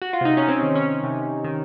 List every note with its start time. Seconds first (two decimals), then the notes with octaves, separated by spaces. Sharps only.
0.02 F#4
0.13 F4
0.21 C3 D#4
0.37 C#4
0.48 C4
0.63 D#3
0.76 C#4
1.04 C3
1.44 D#3